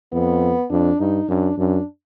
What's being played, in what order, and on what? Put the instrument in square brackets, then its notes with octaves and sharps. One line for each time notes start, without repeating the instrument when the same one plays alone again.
[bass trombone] F2 [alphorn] B3
[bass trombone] F2 [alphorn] D4
[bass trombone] G2 [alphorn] D#4
[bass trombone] F#2 [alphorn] D4
[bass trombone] F#2 [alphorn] D4